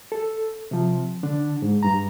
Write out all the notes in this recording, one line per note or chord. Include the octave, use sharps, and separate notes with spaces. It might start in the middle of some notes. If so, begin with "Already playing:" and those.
A4
C3 F3
D3 D4
G#2
G2 A#5